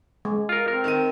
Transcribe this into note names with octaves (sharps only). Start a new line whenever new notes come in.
G#3
F4 A#4
C4 A#4
D#3 D#7